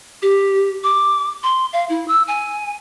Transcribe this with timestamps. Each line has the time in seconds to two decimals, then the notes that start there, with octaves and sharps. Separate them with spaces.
0.22 G4
0.84 D6
1.43 C6
1.73 F5
1.89 E4
2.08 E6
2.28 G#5